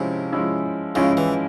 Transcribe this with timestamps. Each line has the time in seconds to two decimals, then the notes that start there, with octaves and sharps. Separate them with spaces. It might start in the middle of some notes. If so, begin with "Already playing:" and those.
Already playing: C3 F3 G#3 C#4 E4
0.33 F3 G#3 C#4 E4
0.95 C#3 F3 G#3 C#4 E4
1.17 E3